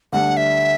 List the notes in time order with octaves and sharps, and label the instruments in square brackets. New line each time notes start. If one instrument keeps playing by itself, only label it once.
[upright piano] D2 D3 G3 D4 [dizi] F#5
[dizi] E5